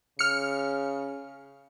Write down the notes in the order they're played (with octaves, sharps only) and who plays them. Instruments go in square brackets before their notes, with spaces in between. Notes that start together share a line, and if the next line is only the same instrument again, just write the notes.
[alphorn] C#3 [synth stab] F6 C#7